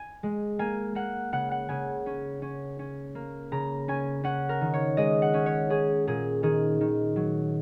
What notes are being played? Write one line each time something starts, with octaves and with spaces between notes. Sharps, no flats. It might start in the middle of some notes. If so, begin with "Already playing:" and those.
Already playing: G#5
G#3
A#3 G#5
A#3 F#5
C#3 F#5
F#5
C#3 G#5
C#4
C#4
C#4
A#3
C#3 A#5
C#4 G#5
C#4 F#5
A#4
D#3
C#5
G#3 D#5
F#5
C#4
C#5
C#4 G#4
A#2 G#4
D#3 G#4
D#3
F#3